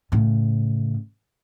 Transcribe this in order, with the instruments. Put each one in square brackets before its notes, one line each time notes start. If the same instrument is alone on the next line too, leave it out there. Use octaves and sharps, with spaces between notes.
[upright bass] A2 C#3